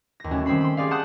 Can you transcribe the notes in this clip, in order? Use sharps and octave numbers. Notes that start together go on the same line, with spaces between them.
D#2 A#6
G3 A3 C#4 E4 F#4
D#3 G3 C4 C#4 B5 C7
B5 C6
G4 G#4 D5 F5
F#5 A5 C6 D#6 F#6 G6